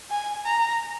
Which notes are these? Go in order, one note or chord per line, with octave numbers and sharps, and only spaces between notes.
G#5
A#5